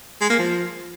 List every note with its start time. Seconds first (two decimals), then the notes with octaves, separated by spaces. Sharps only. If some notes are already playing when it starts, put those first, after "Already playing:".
0.21 G#3
0.30 A#3
0.39 F3